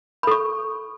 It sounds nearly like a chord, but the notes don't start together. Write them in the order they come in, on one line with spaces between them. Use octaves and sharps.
B5 A4 C#6